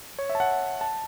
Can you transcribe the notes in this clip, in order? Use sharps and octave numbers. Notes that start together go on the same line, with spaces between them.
C#5
E5
A5
F#5
A5